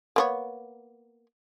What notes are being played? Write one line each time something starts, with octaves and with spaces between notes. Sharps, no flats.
A#3 B3 C#5